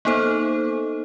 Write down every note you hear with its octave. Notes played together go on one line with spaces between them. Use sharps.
A#3 B3 D#4 A4 C5